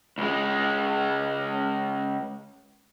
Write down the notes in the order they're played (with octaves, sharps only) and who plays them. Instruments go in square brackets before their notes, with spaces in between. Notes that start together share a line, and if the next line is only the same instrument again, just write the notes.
[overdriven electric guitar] C#2 G#3